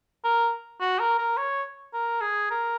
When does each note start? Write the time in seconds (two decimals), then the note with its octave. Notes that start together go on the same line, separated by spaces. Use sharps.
0.24 A#4
0.81 F#4
0.99 A#4
1.19 A#4
1.38 C#5
1.94 A#4
2.21 G#4
2.51 A#4